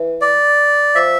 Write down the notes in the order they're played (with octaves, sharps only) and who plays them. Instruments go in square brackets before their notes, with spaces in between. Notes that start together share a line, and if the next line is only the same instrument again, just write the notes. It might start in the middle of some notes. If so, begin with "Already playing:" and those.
Already playing: [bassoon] E3
[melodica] D5
[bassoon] F3 [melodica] E5